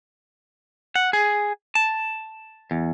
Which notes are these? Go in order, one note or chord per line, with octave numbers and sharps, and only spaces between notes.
F#5
G#4
A5
E2